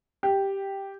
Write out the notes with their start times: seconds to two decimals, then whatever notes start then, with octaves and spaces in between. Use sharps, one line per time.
0.23 G4